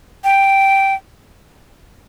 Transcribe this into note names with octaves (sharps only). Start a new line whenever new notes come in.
G5